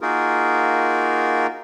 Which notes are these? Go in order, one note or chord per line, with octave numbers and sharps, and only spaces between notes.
A#3 D#4 F4 F#4 G#4 A#4